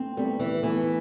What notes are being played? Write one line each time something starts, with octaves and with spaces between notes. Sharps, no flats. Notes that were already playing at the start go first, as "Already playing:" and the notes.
Already playing: A3 B3 C4
G3 A3 B3
E3
E3 A3 B3